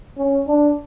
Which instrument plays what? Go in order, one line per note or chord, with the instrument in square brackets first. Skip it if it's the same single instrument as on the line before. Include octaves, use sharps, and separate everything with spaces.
[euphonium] C#4
D4